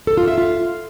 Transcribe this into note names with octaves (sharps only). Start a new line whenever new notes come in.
A4
F4
E5
F4